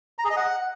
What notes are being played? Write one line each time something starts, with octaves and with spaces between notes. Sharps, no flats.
A#5
G#4
D#5
F#5